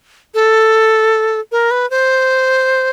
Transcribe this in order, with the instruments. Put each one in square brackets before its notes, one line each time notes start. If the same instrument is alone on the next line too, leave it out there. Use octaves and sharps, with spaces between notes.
[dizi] A4
A#4
B4
C5